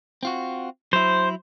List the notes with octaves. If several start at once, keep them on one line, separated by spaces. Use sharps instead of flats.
C4 F4 F#4
F#3 E4 C5